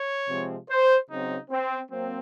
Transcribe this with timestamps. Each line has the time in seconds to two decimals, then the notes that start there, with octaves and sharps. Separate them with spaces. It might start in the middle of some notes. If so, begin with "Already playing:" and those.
Already playing: C#5
0.29 C3 F3 G#3 C4
0.69 C5
1.10 C#3 F#3 C4 D#4
1.51 C4
1.91 F#3 A#3 C4